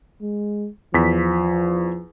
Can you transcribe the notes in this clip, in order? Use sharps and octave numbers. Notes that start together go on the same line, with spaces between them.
G#3
E2 F3 B6